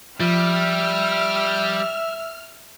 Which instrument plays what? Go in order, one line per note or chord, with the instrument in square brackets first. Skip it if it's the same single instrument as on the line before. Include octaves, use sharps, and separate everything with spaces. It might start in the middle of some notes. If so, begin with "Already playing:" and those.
[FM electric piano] F3 [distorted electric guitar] G3 [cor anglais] E5 [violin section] F6